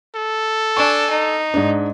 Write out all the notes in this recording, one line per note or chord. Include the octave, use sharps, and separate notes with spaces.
A4
D4 G#5 C#6
D#4
G#2 D4